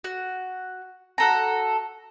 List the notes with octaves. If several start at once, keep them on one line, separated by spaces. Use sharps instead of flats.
F#4
F#4 A4 A#5